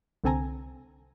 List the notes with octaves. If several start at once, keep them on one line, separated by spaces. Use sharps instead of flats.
C2 D3 C4 A4 G#5 A#5